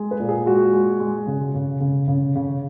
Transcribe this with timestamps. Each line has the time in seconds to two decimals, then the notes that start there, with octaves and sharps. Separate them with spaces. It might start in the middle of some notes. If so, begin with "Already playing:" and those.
Already playing: G#3
0.11 B4
0.20 A#2
0.29 G#4
0.46 G#3 F#4
0.73 G#3
1.00 G#3
1.27 C#3
1.54 C#3
1.80 C#3
2.08 C#3
2.35 C#3